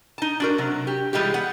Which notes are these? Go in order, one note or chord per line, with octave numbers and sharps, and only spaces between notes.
D#4 A5
D4 F#4 A#4
C3 F#3
G4
E3 G3 G#3 F4 G4
B3 F#5